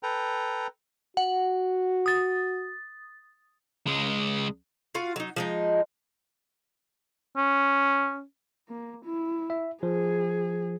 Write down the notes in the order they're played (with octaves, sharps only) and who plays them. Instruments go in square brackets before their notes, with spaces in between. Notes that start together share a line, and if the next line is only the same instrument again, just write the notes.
[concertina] A4 B4 G5 A#5
[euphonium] F#4 [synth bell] F#5
[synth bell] D#6 A6
[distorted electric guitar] C#2 G#3
[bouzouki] F4 F#4 F5
F#3 D#4
F3 G#3 D#4
[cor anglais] C#4
[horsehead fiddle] A#3
E4
[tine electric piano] E5
[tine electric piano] F3 [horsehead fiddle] G#4